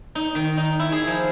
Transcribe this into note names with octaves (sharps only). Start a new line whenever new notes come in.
D#4
D#3
D#4
E4
G#4
F3